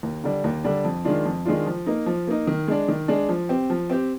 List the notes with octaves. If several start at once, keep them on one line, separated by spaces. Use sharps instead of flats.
D#2
D3 G3 D4
D#2
D3 G3 D4
F2
D#3 G#3 D4 F4
F2
D#3 G#3 D4 F4
F3
A#3 D#4
F3
A#3 D#4
D#3
G#3 D4
D#3
G#3 D4
F3
C4 G4
F3
C4 G4